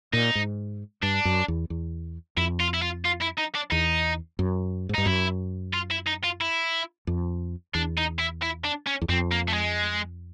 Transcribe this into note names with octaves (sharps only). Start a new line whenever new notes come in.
A#2 D#4
G#2
G2 D4
F#2
E2
E2
F2 E4
F4
E4
F4
F4
E4
D#4
D4
E2 D#4
F#2
G#2
G2 D#4
F#2 E4
F4
E4
D#4
F4
E4
F2
E2 D4
D#4
E4
E4
D4
C#4
E2
F2 C4
A#3
A3
G#3